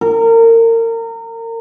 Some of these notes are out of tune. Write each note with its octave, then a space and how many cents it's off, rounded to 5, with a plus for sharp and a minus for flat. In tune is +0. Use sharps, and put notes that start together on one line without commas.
A#4 -30